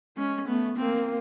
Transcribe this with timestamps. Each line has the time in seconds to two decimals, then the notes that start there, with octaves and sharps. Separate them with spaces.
0.17 G#3 C#4
0.47 A3 B3
0.78 A#3 C4